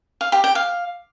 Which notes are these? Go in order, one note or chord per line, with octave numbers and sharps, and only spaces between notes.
F5
G4
G5
F5